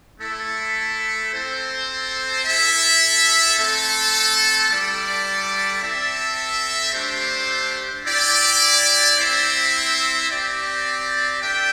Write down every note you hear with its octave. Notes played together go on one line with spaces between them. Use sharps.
A3 E4 A4
C4 A4 C5
E4 A4 E5
A3 C4 A4
G3 E4 A4 D5
C4 A4 E5
A3 D4 G4 C5
E4 G4 D5 G5
C4 E4 C5 E5
C4 G4 D5
D4 A4 E5 G5